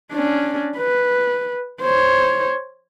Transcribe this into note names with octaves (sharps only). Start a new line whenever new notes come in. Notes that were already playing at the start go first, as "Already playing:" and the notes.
C#4 D4
B4
C5 C#5